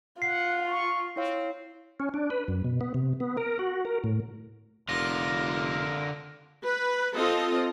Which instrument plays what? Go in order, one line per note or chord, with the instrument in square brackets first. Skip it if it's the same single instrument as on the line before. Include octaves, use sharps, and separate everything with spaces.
[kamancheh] F4 [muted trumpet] F#5 [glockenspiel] C7
[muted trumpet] C#6
[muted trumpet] C4 [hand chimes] E4 C#5 F5
[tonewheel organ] C#4
D4
B4
F#2
B2
B3
C3
B3
A#4
F#4
A#4
A2
[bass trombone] F1 [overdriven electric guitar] D3 F4 [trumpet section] A#4 [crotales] A#6
[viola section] B4
C4 F4 A4 D#5